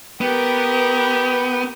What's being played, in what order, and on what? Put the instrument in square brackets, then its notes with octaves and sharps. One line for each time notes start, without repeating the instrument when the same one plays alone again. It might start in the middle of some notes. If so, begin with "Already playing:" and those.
[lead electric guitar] B3 [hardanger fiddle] G4 A#4